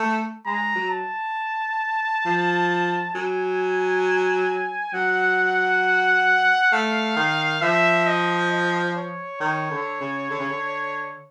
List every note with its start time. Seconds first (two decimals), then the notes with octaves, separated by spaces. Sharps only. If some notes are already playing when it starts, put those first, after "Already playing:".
Already playing: A3
0.46 G#3 A#5
0.75 F#3
0.91 A5
2.26 F3
3.15 F#3 G#5
4.94 F#3 F#5
6.72 A3 F5
7.17 D#3
7.62 F3 E5
8.07 D#5
8.51 D#5
8.96 C#5
9.40 D#3 C#5
9.71 D3
10.01 C#3
10.30 D3
10.39 C#3
10.49 D3